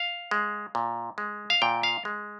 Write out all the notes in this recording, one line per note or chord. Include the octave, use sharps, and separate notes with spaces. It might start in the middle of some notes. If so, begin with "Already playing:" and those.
Already playing: F5
G#3
A#2
G#3
F5
A#2 G5
F5
G#3